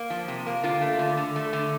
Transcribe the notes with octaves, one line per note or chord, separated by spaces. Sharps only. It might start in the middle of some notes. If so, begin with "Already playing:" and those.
Already playing: A#3
F3
C3
A#3
D3 F4
A3
D3
D3
A3
D3